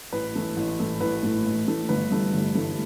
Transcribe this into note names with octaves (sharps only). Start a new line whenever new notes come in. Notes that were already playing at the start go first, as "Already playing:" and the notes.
A1 B4
A2 E3 A3
A1
A2 E3 A3
A1 B4
A2 E3 A3
A1
A2 E3 A3
G1 B4
G2 E3 A3
G1
G2 E3 A3